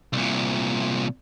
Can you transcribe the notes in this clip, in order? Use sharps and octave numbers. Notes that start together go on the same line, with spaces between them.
C2 A#2